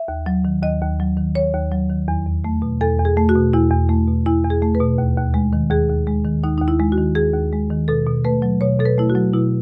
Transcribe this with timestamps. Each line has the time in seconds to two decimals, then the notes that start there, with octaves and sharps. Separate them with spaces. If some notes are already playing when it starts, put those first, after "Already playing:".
Already playing: E5
0.08 D#2
0.26 F#3
0.45 D#3
0.63 D#2 D#5
0.81 D#2
1.00 F#3
1.17 D#3
1.35 D#2 C#5
1.53 D#2
1.71 F#3
1.89 D#3
2.08 E2
2.26 E2
2.44 A3
2.62 B2
2.81 E2 A4
2.99 E2
3.05 G#4
3.17 A3
3.29 F#4
3.35 B2
3.53 E2 E4
3.71 E2
3.89 A3
4.08 B2
4.26 E2 E4
4.44 E2
4.50 G#4
4.62 A3
4.75 B4
4.80 B2
4.98 D#2
5.17 D#2
5.34 G#3
5.53 D#3
5.70 D#2 G#4
5.89 D#2
6.07 G#3
6.25 D#3
6.44 D#2 D#4
6.58 D#2 D#4
6.68 E4
6.80 G#3
6.92 F#4
6.98 D#3
7.15 D#2 G#4
7.34 D#2
7.52 G#3
7.70 D#3
7.88 B2 A4
8.07 B2
8.25 A3 B4
8.42 F#3
8.61 B2 C#5
8.79 B2 A4
8.86 B4
8.98 A3 E4
9.10 F#4
9.15 F#3
9.33 B2 E4